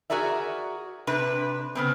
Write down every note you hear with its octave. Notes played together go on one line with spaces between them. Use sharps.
F#4 G#4 A#4 D5 E5
C3 D4 B4
C#3 B3 C4